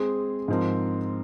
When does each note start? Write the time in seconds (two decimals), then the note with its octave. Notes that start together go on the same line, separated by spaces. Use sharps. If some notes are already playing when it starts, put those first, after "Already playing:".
Already playing: G#3 C4 G#4
0.48 G#2 F3 C4 D#4 A#4